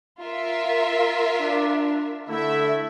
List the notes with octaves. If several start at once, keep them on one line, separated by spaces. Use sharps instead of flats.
F4 A#4 E5
D4
D3 A3 E4 E5